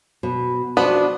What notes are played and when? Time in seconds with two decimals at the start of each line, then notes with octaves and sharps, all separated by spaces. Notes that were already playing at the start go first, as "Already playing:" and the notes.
0.23 B2
0.77 F3 B3 D4 F#4 B4